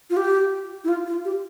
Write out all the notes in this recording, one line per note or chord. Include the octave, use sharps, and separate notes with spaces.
F4
G4
E4
F4
F4
G4